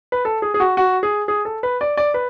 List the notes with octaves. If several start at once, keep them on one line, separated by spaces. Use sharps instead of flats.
B4
A4
G#4
G#4
F#4
F#4
G#4
G#4
A4
B4
D5
D5
B4